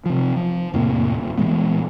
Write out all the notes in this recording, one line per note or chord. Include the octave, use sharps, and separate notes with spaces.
C3 F3
F3
E2 A2 C3 A#3
D#1
A#2 E3 G#3 B3